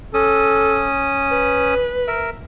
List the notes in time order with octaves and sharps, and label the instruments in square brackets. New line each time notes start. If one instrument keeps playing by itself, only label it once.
[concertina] C#4 D#6 [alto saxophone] A4
[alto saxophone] B4
[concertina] A#4 E5